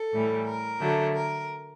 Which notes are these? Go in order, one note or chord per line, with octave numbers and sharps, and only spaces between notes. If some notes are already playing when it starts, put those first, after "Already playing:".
Already playing: A4
A2 E3 G3
A#4
D3 F#3 A3
A#4